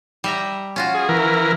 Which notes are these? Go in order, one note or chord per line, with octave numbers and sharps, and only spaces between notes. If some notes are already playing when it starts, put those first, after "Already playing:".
G3 E5 A#5
C#4 F4 F#4
G#4
E3 A#4